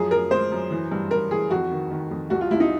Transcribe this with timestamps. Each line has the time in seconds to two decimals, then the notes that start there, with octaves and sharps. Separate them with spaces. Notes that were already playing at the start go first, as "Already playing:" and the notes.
Already playing: F#2 F3 G#4
0.11 F#2 A#4
0.31 G#3 C5
0.52 F#2
0.71 E3
0.92 G2
1.11 G2 A#4
1.31 E3 G#4
1.50 F2 F#4
1.71 D#3
1.91 D#3
2.11 F2
2.30 C2 F#4
2.41 F4
2.51 C2 E4
2.60 D#4